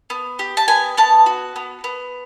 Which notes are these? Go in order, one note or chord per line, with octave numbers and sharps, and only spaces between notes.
B3
G4
A5
B3 G#5
B3 A5
F#4
B3
B3